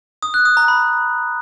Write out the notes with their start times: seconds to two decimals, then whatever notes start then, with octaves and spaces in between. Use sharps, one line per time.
0.23 D#6
0.34 F#6
0.45 D#6
0.57 A#5
0.68 B5